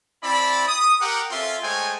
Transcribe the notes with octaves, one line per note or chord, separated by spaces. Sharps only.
C4 E4 D5 A5 B5
D#6
G4 A#4 F#5
C4 C#4 F4 A4 E5 C6
G#3 A3 C5 C#5 G5 G#5